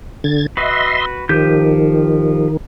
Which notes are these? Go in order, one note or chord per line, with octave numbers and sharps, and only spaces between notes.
D3 G#6 A6
F#4 B4 D#5 E5 C6
D#3 F3 G4 G6